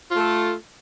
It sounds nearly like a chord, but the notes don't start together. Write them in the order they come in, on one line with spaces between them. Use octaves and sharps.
F4 A3 A4